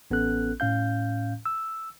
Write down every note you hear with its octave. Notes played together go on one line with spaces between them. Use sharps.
A1 B3 C#4 A4 F#6
A2 C#4 F5 G6
E6